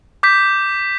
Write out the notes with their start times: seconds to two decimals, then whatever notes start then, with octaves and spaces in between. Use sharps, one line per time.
0.23 D6 G6 B6